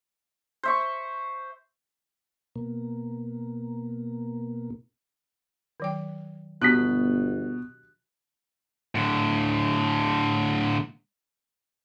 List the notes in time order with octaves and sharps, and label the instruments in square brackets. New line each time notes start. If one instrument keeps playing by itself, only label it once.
[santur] C5 E5 C#6
[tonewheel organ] B2 A#3
[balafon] D#3 F#3 G5
[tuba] G1 [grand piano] B2 [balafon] D4 F#4 G4 [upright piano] F#6 B6
[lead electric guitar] A2 D3